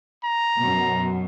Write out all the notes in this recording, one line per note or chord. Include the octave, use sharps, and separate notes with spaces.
A#5
F#2 B2